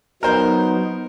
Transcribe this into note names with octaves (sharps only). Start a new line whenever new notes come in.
F#3 B3 D#4 A#4 C5